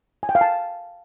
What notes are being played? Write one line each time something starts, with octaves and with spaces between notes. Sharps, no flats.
G#5
G5
F5
A5